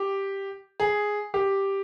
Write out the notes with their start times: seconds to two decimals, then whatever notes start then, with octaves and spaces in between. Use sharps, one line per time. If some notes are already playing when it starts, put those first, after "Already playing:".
Already playing: G4
0.80 G#4
1.34 G4